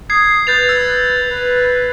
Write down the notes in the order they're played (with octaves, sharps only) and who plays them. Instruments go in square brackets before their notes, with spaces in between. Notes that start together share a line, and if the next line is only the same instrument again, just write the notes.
[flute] D#6 [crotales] G#6 C7
[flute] B4 [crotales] G6 A6 F7
[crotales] E6
[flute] B4